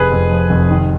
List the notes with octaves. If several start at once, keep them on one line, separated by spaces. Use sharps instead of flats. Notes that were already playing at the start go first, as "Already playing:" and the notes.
Already playing: F1 G#4 B4
F2
F3
F1
D#3